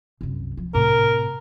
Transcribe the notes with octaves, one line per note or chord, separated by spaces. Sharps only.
C2 F#2
F3
A2 C3 A#4